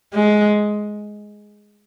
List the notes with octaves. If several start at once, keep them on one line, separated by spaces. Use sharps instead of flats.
G#3